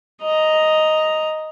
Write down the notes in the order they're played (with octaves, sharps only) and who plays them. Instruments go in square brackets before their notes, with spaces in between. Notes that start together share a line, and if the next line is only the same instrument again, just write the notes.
[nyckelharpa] D#5 A#5